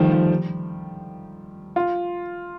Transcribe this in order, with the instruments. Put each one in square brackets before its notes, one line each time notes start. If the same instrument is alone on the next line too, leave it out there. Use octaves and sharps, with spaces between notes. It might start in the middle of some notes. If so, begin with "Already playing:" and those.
Already playing: [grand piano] D#3 F3 G3 A3
F3
F4